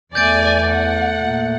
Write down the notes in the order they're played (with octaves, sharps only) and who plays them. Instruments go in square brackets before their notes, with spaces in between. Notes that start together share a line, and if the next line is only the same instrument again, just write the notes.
[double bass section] E2 [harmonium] A3 [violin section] D5 G#5 [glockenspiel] G6 A6 D7
[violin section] F#5
[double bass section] A#2